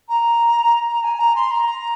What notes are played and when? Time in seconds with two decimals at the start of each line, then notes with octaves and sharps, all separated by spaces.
0.09 A#5
0.88 A#5
1.04 G#5
1.19 A#5
1.36 C6
1.51 A#5